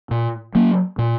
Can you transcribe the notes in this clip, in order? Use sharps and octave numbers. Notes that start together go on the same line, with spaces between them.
A#2
F#3 A#3
A#2